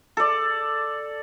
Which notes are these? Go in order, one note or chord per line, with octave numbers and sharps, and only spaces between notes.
A4 D5